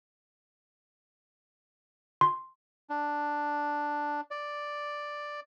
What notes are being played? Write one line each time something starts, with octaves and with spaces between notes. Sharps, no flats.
C6
D4
D5